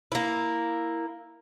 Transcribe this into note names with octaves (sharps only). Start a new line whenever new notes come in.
A#3 E4